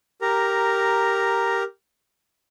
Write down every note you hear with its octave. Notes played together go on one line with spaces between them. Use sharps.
G4 A#4 A#5